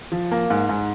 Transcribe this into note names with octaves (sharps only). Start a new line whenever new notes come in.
F3
A#3
G#2
G#2